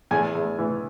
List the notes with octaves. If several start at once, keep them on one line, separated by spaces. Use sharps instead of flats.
E2 G#5
E2
E3